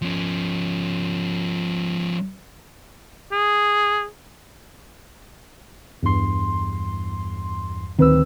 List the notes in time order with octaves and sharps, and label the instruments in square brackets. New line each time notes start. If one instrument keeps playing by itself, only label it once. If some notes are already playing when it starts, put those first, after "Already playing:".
[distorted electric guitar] F3 C#4
[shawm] G#4
[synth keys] E2 G2 C6
[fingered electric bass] D1 D2 D#3 [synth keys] C4 B4 E6